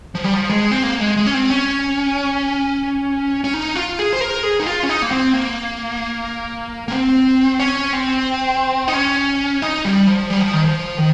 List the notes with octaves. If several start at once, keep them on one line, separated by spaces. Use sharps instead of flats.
F3
G3
F3
G#3
C4
A#3
G#3
G#3
C#4
C4
C#4
C#4
D#4
F4
G#4
C5
A#4
G#4
D#4
F4
C#4
D#4
A#3
C4
A#3
A#3
C4
C#4
C4
D#4
C#4
D#4
G3
F3
G3
F3
D#3
F3
D#3